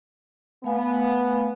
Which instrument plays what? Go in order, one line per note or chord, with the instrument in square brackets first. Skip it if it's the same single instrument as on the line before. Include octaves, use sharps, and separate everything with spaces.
[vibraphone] A3 F5 G#5 [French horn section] B3